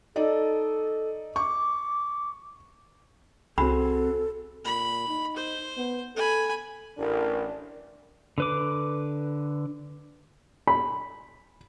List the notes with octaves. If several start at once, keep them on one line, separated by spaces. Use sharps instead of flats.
D#4 A4 D5 D#5
C#6 D6
C2 C4 F#4 G#4 A4 B5
A#2 B5
D#4
C5
B3
A4 G#5 B5
A1 D4 A#4
D3 B4 D6
B5